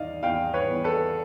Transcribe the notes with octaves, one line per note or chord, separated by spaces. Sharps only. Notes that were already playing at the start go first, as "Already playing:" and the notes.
Already playing: E2 D#3 D5 D#5 F5
E2 F5 G5
B4 C#5
E2
A4 B4